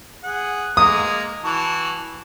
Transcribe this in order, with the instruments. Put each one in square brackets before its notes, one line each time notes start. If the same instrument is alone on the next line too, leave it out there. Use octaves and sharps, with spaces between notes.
[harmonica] G#4 F#5
[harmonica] G#3 A#3 A#5 [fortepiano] D#6
[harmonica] E3 F#4 A5